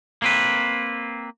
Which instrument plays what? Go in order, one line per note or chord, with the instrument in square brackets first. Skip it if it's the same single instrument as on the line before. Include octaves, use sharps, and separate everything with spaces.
[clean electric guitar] A#3 C4 B4